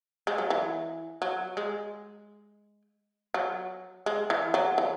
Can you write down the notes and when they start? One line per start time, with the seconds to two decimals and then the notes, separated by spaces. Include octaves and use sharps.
0.27 G#3
0.38 F#3
0.50 E3
1.22 F#3
1.57 G#3
3.34 F#3
4.06 G#3
4.30 E3
4.54 F#3
4.78 E3